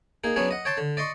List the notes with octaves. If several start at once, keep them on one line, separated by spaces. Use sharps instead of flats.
A#3 D#4 G#4
F#3 B3 C#4 D4 G#4
D#5 F#5
C#5 G5 A5 C6
D3
D5 D#5 C6 C#6